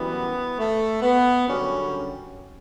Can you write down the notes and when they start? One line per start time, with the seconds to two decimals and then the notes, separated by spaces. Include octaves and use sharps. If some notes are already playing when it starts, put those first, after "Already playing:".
Already playing: F#2 E3 G3 B3
0.58 A3
1.02 B3
1.48 F#2 D3 G3 C#4